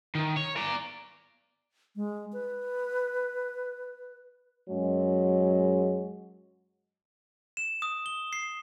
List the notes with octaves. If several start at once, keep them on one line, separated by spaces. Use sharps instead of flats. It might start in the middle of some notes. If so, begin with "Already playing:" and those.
D#3
C#5
D5 A#5
G#3
B4
F#2 F#3 G#3
E7
D#6
G7
C7